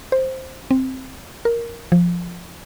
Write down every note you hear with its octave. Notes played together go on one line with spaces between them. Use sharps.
C5
C4
A#4
F3